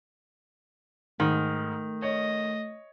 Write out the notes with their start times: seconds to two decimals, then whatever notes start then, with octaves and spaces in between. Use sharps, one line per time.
1.20 G#2 D#3 A3
2.02 C#5 D#5